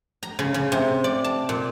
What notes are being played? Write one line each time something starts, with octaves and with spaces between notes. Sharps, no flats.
A#5
C#3
C#3
C3
D5
A5
A#2